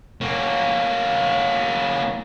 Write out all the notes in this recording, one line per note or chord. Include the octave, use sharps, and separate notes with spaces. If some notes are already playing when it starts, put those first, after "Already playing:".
A#3 C#4